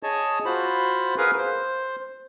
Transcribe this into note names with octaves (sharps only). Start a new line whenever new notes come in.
G#4 C#5 D#5 A5
F4 F#4 C5 B5
G#4 A#4 B4 F5
C5